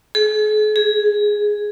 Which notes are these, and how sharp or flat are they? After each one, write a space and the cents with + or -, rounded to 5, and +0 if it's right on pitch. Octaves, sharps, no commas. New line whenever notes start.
G#4 +45
G#4 +0